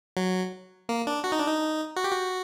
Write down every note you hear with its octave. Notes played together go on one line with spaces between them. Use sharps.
F#3
A#3
D4
F#4
D#4
D4
D#4
F#4
G4
F#4